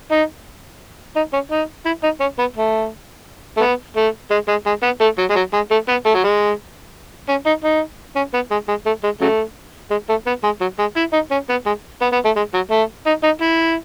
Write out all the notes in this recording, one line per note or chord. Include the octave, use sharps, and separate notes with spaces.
D#4
D#4
C#4
D#4
E4
D#4
C#4
B3
A3
A3
B3
A3
G#3
G#3
G#3
B3
A3
F#3
G#3
F#3
G#3
A3
B3
A3
F#3
G#3
C#4
D#4
D#4
C#4
B3
G#3
G#3
A3
G#3
C#3 F#3 A3
G#3
A3
B3
G#3
F#3
G#3
E4
D#4
C#4
B3
G#3
B3
B3
A3
G#3
F#3
A3
D#4
D#4
E4